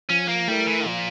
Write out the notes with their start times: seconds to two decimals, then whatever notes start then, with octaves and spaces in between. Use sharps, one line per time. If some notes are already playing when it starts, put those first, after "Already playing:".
0.09 F3 C#4
0.28 A#3
0.48 G3 A3 E4 A#4
0.67 E3
0.86 A#2 F3